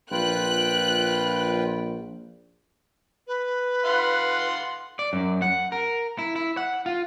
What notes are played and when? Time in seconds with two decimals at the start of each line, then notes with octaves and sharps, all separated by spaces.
0.12 A#1 F4 B4 G5 F#6
3.27 B4
3.84 F5 F#5 C6
4.99 D5
5.13 F#2
5.42 F#5
5.72 A#4
6.18 E4
6.36 E4
6.57 F#5
6.86 F4